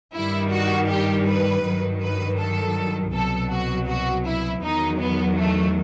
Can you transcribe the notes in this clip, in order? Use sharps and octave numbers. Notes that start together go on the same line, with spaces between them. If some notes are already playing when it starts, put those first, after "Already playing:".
G2 D#3 G3 E4
F#4
G4
B4
G2 D#3 F#3
B4
A4
C2 B2 F#3 A4
F#4
F#4
E4
E2 D#3 F#3 D#4
B3
A3